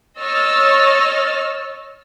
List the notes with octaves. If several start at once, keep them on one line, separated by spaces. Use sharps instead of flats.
C#5 D#5 C#6 E6 F6 A6